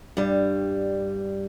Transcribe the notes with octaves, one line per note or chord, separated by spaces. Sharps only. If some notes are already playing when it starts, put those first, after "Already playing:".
G2 G3